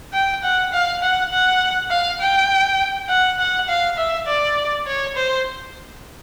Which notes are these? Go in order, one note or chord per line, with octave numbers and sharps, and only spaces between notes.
G5
F#5
F5
F#5
F#5
F5
G5
F#5
F#5
F5
E5
D5
C#5
C5